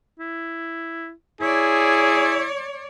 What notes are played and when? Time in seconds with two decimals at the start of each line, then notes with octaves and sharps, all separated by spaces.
0.19 E4
1.41 E4 G#4 C#5 D5